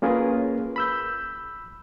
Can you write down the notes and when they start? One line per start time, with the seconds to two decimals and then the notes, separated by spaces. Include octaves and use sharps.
0.02 A#3 C#4 F4 G#4 A#4 B4
0.76 B5 E6 G6